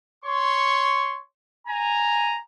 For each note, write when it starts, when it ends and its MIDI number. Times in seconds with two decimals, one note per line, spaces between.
0.25 1.19 73
0.25 1.19 84
0.25 1.19 85
1.68 2.38 80
1.68 2.38 82